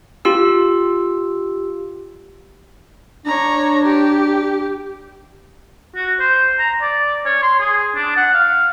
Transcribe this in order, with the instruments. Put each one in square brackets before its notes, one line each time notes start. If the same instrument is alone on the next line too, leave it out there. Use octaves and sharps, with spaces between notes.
[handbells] F4 G4 E6
[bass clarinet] D4 [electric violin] C#5 A#5
[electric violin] G4
[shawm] F#4
C5
A#5
D5
C#5
C6
G#4
D4
F#5
F5